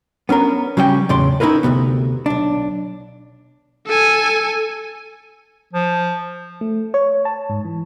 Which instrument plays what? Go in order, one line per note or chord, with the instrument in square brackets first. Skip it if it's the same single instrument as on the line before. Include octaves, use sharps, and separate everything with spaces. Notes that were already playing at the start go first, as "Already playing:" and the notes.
[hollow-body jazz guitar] B3 C#4 D4 A#4
C#3 F#3 G3 C#4 F#4 G5
E2 A2 C#3 D5 C6
C#4 D#4 E4 G#4 A#4 B4
D2 G#2 C3 B3
B1 D4
[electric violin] A4 G#5
[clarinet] F3
[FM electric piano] A3
C#5
A5
G#2
E3